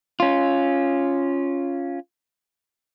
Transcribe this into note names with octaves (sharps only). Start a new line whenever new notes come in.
C#4 F4